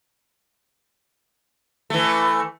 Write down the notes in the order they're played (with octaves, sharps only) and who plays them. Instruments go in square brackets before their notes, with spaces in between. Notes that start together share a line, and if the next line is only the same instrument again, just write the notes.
[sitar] E3 A3